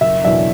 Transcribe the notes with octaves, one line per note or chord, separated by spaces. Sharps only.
F#1 E5
E2 B2 F#3 D4 E5